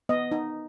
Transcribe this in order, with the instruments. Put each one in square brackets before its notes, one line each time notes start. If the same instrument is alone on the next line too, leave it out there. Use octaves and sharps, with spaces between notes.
[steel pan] B3 D#5
D#4